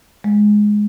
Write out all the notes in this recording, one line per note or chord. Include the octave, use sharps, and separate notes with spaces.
G#3